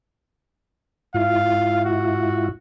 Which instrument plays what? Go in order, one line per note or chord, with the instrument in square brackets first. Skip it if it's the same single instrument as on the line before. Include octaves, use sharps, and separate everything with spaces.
[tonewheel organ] G#2 E4 F4 [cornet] F5
[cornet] F#4